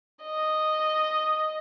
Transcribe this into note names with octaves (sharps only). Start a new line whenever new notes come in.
D#5